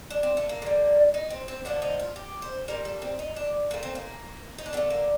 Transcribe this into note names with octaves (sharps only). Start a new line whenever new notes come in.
D4
C4
A3
A#3
D3 G3
D#4
C4
C4
D3 F3 A3 D4
D#4
F4
G4
C5
A#2 G3 A#4
A4
C4
D#4
D4
A#2 A3 A#3
C4
A#3
D#4
D4
D3 A3 C4
A#3